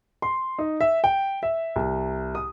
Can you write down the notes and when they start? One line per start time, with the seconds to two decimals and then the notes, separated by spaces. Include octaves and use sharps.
0.22 C6
0.59 D#4
0.81 E5
1.04 G5
1.43 E5
1.76 C2
2.35 D#6